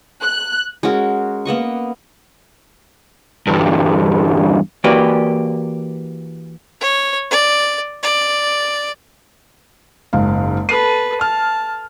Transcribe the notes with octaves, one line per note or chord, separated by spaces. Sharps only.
F#6
G#3 C#4 F#4 A#4
A#3 B3 D#5 C#6
E2 G2
E3 A#3 F#4 G4 B4 D5
C#5
D5
D5
F#1 G#2 F5
A4 B4 C7 D#7
A5 F6